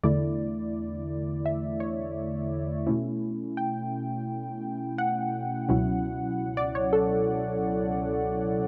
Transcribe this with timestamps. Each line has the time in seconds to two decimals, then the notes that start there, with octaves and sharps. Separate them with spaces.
0.03 E2 D3 A3 E4 D5
1.46 E5
1.80 C#5
2.87 B2 A3 C#4 E4
3.57 G5
4.98 F#5
5.69 C#2 B2 F#3 C#4 E4
6.57 D5
6.75 C#5
6.93 A4